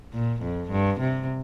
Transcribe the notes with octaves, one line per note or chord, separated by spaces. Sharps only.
A#2
F2
G2
C3